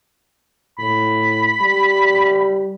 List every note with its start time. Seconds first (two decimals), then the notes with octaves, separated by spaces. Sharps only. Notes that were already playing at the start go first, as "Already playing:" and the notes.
0.79 A2 B5
1.61 G3